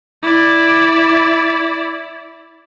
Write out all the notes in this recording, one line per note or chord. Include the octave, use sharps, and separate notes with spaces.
E4 D5